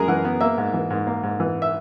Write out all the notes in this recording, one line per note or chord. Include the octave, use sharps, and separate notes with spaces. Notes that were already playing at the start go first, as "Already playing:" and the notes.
Already playing: F#2 G#3 G#4 A#4
E3 F#5
B3
A#3 E5
G#2
E3
G#2
A#3
G#2
E3
E5